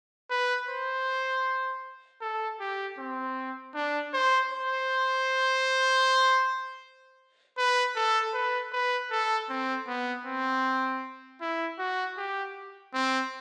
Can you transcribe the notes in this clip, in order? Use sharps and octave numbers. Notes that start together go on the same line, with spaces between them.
B4
C5
A4
G4
C4
D4
C5
C5
B4
A4
B4
B4
A4
C4
B3
C4
E4
F#4
G4
C4